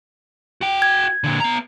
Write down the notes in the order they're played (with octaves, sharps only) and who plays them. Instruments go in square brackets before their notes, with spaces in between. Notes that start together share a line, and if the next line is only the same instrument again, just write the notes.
[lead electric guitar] F#4 G5
[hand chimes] G#6
[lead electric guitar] A#2 D3
B3 A#5